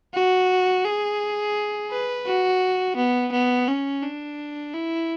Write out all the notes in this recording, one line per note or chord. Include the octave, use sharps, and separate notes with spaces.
F#4
G#4
B4
F#4
B3
B3
C#4
D4
E4